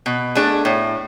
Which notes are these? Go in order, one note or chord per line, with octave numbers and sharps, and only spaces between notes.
B2
A3 D4 G#4
A2